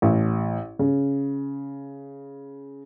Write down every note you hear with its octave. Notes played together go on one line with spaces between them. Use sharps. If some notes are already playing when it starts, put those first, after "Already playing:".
A1
C#3